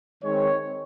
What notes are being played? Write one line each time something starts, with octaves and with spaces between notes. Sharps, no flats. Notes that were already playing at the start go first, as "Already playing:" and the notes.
D#3 G#3 C4 D#4 C#5